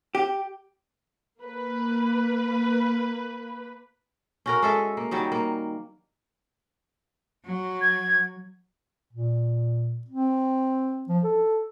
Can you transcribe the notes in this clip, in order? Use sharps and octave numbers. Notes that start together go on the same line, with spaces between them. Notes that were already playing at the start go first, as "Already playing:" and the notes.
G4
A#3 B4
C#4 F#4 A#4
G#3 A4 E5
A#3
D#3 F#3 G3
A#3
F#3
G#6
A#2
C4
F3
A4